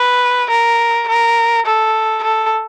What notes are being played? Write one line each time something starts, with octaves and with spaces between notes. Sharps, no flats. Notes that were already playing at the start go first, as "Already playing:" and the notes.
Already playing: B4
A#4
A#4
A4
A4